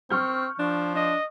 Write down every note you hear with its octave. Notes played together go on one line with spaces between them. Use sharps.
C4 C#6 F6 G6
F3 D4
D4 D#5